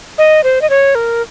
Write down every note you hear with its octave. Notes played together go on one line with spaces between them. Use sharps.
D#5
C5
D#5
C#5
A#4